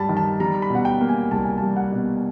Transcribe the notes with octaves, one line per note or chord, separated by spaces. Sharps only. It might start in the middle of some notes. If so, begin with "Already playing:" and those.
Already playing: G2 G3 A5 B5
D#3
A5
G3 A#5
B5
B2
F#5
G5
A#3
G#5
C2 A5
G#5
G3 A5
F#5
B2